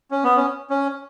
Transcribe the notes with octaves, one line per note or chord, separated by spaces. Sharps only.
C#4
B3
C#4
C#4